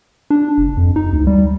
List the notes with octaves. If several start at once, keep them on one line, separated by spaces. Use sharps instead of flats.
D4
F1
F2
D#4
D2
G3